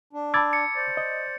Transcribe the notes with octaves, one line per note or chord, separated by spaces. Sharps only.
D4
A5 B5 D6 E6 G#6 A6
C#7
C5 D5
D#5